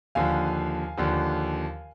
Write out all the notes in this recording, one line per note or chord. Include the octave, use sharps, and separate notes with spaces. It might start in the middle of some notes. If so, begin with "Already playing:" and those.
D#2 D3 F3 F5 G#5
D#2 D3 F3